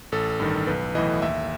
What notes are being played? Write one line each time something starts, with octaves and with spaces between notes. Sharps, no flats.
A1 A4
G2 D#3
B1 B4
A2 E3 D#5
D#2 E5